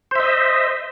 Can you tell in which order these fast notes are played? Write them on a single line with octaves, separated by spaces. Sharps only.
C5 E5 D#5